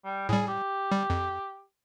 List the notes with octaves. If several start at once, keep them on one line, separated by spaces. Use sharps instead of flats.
G3
A2 G3 G#4
G4
G3
F2